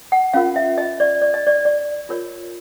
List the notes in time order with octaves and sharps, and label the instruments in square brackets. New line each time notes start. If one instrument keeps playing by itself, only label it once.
[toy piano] F#5
C#4 F4 A#4 F5
E5
D#5
D5
D5
D#5
D5
D5
F4 A#4 C#5